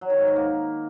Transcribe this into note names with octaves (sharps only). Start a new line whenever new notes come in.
F#3
D#3
G#2
D#3
A#3